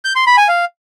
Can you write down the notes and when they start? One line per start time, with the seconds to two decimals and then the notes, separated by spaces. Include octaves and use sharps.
0.05 G6
0.16 C6
0.27 B5
0.37 G#5
0.48 F5